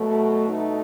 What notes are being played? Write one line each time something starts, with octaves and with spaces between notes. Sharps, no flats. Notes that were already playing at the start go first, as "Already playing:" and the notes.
Already playing: B2 F#3 A3
B2 A3 D#4